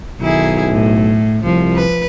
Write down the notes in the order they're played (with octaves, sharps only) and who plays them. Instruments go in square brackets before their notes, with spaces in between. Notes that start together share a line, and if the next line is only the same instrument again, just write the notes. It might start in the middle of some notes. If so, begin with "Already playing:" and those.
[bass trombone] B1 [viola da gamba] D#3 E4 G#4
[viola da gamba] A2
[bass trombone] C2 [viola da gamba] F3
[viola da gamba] B4